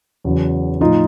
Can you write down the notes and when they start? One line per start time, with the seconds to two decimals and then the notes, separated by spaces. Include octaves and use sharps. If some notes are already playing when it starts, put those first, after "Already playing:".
0.24 E2 C#3 F#3
0.80 A2 F3 D#4 F4